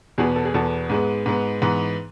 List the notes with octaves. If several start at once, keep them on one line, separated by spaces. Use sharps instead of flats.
E2 B2 B3 G#4
A4
G#4
E2 B2 B3 A4
G#2 G#3 B3
G#2 G#3 B3
G#2 E3 B3